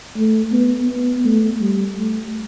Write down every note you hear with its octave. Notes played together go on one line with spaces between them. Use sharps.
A3
B3
B3
A3
G3
A3